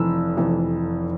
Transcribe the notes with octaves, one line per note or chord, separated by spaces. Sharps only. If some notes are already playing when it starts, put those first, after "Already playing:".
Already playing: F1 F2 E3 E6
F1 F2 E3